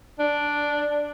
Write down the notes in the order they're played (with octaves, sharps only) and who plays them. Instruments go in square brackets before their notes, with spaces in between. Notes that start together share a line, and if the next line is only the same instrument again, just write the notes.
[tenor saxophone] D4